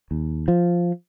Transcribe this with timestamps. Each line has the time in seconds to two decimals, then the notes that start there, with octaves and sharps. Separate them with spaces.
0.11 D#2
0.48 F3